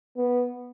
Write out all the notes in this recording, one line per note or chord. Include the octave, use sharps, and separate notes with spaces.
B3